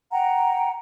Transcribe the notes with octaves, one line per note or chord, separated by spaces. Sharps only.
F#5 G5 A#5